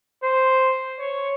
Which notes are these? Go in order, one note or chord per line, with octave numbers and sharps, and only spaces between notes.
C5
C#5